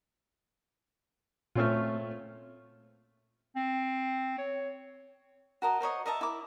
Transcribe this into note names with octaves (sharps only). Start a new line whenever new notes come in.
A#2 A3 C4 C#4 F4 F6
C4
C#5
F#4 A#4 D#5 A5
A#4 C5 C#5 D#5
A#4 D#5 E5 A5
E4 A#4 D6